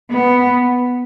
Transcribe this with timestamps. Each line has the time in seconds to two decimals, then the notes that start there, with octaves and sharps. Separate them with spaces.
0.11 B3